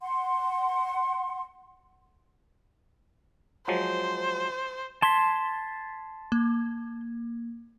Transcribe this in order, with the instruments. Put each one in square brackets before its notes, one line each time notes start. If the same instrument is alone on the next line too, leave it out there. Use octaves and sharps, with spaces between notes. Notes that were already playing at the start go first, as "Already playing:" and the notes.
[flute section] F#5 C6
[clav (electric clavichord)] F3 F#3 G#3 [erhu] C5
[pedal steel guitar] A5 C6 [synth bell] G#6 B6
[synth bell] A#3